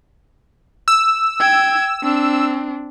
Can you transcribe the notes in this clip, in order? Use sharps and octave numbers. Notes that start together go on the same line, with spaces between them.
E6
G5 G#6
C4 D4